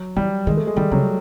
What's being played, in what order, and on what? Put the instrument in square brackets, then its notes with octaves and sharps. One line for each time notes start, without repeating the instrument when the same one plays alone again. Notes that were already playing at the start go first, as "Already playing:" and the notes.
Already playing: [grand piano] F#3
[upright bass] E3 [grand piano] G3
[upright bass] D#3 [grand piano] G#3
[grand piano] A3
G#3
[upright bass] D#3 [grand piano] G3
[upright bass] C#3 [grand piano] F#3